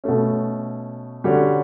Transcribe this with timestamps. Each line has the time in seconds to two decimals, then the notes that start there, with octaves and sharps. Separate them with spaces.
0.04 B2 A3 C#4
1.24 D3 G3 C#4 F#4 C#5